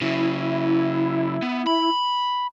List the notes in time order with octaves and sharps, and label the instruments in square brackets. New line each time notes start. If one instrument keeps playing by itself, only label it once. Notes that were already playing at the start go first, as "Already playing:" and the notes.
[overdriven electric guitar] C#3 F#3 [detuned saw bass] E4
[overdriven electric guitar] B3
B5